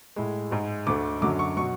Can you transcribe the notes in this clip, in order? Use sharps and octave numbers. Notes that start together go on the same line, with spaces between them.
A2 G#3
G#2 G#3
D2 D3 A3 D6
F#2 D3 F#3 D6
C#6
B2 F#3 C#6